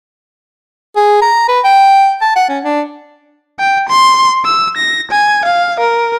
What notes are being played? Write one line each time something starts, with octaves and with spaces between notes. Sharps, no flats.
G#4
A#5
B4
G5
A5
F#5
C#4
D4
G5
C6
E6
A#6
G#5
F5
A#4